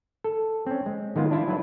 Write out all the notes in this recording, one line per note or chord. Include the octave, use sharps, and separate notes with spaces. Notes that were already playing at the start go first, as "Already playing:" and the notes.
A4
C4 C#4
G#3
D#3 G#3 B3 F4
D4 E4 F4
F#3 E4 F4 B4